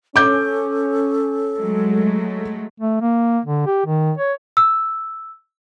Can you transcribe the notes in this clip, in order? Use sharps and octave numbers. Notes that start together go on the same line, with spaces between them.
C#4 A4 D6 G6
F#3 G#3 A3
A3
A#3
D3
G4
D#3
C#5
E6